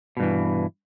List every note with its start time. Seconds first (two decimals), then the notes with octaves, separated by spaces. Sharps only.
0.17 B2
0.20 G2
0.23 E3